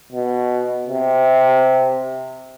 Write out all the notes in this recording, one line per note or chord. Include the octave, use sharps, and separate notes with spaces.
B2
C3